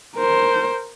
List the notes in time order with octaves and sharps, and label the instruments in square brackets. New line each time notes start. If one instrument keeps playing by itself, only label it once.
[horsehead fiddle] A#4 C5